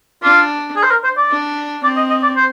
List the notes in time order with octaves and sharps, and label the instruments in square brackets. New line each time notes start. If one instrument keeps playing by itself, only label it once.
[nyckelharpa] D4 [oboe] F4
[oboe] G#4
C5
A#4
C5
D5
[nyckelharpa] D4
[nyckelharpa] C4 [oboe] D5
[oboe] D#5
D#5
D5
C5